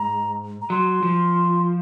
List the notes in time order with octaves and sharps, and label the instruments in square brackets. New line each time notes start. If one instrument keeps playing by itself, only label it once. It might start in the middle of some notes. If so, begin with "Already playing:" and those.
Already playing: [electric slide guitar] G#2 [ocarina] A#5
[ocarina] A#5
[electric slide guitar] F#3 [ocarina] C6
[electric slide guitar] F3